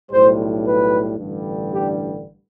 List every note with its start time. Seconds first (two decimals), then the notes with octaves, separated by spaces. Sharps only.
0.11 B1 A2 G3 C5
0.65 B4
1.18 A1 G2 D3 G3
1.72 G4